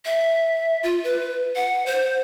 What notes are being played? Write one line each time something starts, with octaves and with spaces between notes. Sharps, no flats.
E5
F4
B4
F#5
C5